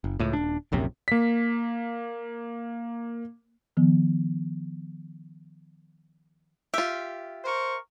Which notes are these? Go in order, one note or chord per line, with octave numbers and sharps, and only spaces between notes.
F#1
C#2 A2
D#1 D4
D#1 A#1 F#2 C3
A#3 B6
D#3 F3 B3
F4 G4 E5
A#4 C5 C#6